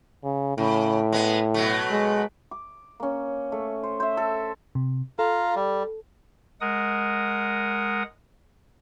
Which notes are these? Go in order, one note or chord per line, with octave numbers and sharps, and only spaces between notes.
C#3
A2 C#3
G#3 B3
B2 F#3 A3
G#3
D6
A#3 C#4
A3
C5
C5 E5
A4
C3
F4 A4 F5 A#5
G3
G#3 A#4 F#5 D#6